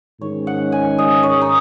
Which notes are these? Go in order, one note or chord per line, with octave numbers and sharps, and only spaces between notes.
G#2 D#3 G#3 C#4 C#5
F#5
G#5
D#5
C#5
D#4